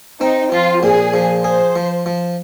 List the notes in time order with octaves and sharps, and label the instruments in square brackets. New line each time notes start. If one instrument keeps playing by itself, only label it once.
[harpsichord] C4 [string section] D#4
[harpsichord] F3 [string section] F4
[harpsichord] A#2 [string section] G#4
[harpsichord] F3
[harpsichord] G#4 [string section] C5
[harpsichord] F3
F3